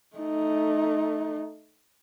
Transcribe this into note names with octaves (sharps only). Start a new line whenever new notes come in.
A3 D#4